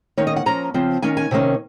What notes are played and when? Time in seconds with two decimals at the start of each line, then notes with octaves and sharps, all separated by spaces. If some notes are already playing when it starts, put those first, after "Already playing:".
0.18 D#3 A#3 C#4 C#5
0.27 D#5
0.36 F#5
0.46 F3 A#3 C#4 A#5
0.74 C#3 F3 C4
1.02 D#3 A#3 C#4 G#5
1.17 G#5
1.31 C3 D#3 A#3 C#4